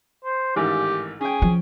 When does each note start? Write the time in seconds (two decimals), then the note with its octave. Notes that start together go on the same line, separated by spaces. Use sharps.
0.24 C5
0.56 A1 G#2 D#3 G4
1.21 C#4 G#4 G5
1.42 F3